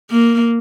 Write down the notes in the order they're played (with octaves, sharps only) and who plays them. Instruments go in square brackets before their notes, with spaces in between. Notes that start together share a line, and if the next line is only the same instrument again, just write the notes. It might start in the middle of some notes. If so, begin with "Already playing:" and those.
[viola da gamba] A#3